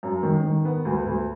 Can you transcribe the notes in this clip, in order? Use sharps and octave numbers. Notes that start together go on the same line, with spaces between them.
F#2
D#3
D#3
B3
D2
D2